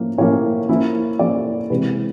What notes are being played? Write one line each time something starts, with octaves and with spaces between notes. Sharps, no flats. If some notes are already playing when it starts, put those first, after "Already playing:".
Already playing: A2 F3 A#3 C#4
A2 F3 A#3 C#4 C#5
F3 A#3 C#4 E4
F3 A#3 C#4 E4 D5
C3 E3 G#3 C4 B4